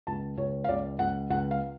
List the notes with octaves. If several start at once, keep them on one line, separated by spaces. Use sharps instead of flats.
C#2 A5
C#2 C#5
F5
C#2 D5
C#2 F#5
C#2 F#5
F5